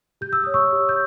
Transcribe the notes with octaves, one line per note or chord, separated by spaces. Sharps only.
G4 G6
E6
C#5 D#6
C#6 E6
G4
G6